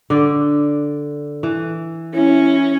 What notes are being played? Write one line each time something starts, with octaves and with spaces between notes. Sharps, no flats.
D3 D5
E3
C#4 E4